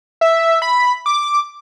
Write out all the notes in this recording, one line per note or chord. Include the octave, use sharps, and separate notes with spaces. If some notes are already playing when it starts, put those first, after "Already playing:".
E5
B5
D6